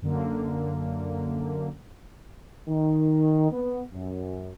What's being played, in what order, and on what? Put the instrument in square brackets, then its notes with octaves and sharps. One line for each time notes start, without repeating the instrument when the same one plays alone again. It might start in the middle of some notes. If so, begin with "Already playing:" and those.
[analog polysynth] F#2 D3 A#3
[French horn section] D#3
B3
F#2